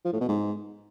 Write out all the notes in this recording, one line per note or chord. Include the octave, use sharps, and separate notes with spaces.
F3
A2
B2
G#2